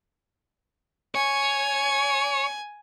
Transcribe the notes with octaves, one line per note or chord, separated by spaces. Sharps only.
C#5 G#5